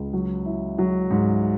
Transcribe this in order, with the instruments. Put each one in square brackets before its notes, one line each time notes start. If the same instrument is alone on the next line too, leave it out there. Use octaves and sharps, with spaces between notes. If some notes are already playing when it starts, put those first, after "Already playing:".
Already playing: [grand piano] C#2
F#3
E4
F#3
G#2